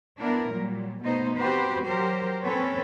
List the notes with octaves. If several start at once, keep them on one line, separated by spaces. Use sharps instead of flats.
B3 D4 E4 A#4
A#2 F#3 G3
B2 A3 B3 D#4 C5
C4 F#4 G4 B4 C5
F#3 G4 A#4 C5
A#2 C4 C#4 A4 B4 C#5